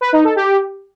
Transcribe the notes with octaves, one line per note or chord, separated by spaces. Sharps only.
B4
D#4
A4
G4